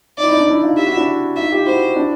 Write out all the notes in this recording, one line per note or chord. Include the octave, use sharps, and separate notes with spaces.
D#4 D5
E4
D#4
D4 E4
D4 E4
D#4 F4
F4 G4 E5
E4 F#4
D4 E4
D#4 F4 E5
F4 G4
E4 F#4 C5
D4 E4